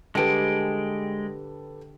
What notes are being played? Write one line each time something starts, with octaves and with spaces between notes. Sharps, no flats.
D3 G3 G#3 G4 A4 B4 G5